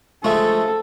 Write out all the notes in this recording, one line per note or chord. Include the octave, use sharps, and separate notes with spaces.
F3 G#3 A3 A4